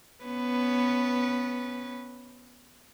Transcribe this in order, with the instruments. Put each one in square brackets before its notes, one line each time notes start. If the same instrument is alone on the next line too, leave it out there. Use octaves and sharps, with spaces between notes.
[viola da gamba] B3 C#4 B4